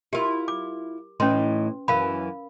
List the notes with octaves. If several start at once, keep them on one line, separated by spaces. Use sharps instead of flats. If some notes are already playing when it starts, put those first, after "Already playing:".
E4 F4 G4 A#4
D6
A2 E3 C#4 D#4 B4 C6
F#2 E3 A#4 F5 B5